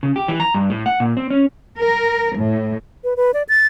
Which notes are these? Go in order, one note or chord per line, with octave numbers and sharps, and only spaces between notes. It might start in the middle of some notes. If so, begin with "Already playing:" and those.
C#3
G4
E3
A#5
G2
A2
F#5
A#2
C4
C#4
A#4
A2
B4
B4
D5
A6